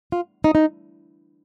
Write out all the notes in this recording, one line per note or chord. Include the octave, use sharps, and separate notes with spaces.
F4
D#4
D#4